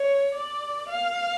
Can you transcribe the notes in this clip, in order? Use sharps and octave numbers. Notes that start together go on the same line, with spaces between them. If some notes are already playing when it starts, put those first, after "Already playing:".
Already playing: C#5
D5
F5